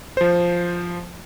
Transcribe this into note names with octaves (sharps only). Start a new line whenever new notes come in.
F3 C5